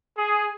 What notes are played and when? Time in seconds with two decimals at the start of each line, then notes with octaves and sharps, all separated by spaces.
0.18 G#4